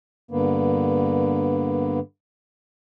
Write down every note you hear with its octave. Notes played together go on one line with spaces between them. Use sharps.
G2 D3 A#3 B3